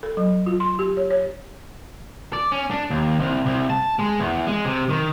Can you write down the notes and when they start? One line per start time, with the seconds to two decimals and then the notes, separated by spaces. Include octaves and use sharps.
0.03 A4
0.17 F#3
0.46 F4
0.60 C6
0.79 G4
0.97 C#5
1.11 C#5
2.33 D5
2.52 C#4
2.70 D4
2.90 D#2
3.19 C2
3.46 C2
3.70 A5
3.99 G#3
4.20 E2
4.47 G#3
4.64 C3
4.89 D#3